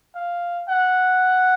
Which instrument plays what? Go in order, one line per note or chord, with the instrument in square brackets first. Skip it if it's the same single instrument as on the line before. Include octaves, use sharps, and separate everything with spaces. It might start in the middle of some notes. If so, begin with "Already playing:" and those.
[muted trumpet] F5
F#5